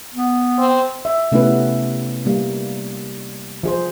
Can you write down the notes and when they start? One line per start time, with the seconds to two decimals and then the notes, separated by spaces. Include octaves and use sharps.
0.14 B3
0.58 C4
1.05 E5
1.32 C3 A3 B3 C#4 E4 B4
2.26 G3 A#3
3.63 F3 G#4 C5